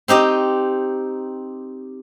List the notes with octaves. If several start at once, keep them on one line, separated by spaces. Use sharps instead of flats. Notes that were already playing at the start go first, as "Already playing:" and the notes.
C4 D#4 G4 D#5